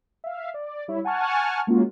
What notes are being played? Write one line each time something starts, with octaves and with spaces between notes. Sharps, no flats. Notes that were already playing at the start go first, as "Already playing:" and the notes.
E5 F5
D5
G3 E4 C#5
F#5 G#5 A5 C#6 F6
G#3 A#3 C#4 F4 F#4